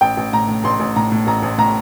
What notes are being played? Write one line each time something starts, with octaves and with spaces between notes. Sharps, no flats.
A1 G5
A1
A2 A#5
A2
A1 C6
A1
A2 A#5
A2
A1 A#5
A1
A2 A#5